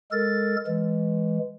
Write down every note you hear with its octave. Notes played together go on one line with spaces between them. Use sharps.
G#3 A4 A#4 A6
E3 G#3